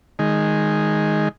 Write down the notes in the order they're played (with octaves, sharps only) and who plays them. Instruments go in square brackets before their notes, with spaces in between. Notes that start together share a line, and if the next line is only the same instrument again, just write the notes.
[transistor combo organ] D#3 G#3